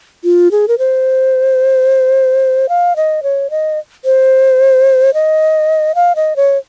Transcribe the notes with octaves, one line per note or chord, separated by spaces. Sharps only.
F4
G#4
A#4
C5
F5
D#5
C#5
D#5
C5
D#5
F5
D#5
C#5